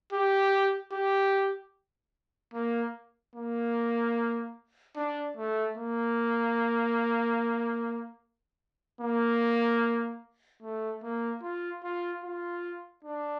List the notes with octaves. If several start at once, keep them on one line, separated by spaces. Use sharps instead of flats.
G4
G4
A#3
A#3
D4
A3
A#3
A#3
A3
A#3
F4
F4
F4
D4